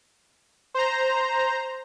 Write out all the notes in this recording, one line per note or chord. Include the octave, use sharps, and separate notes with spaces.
C5 A#5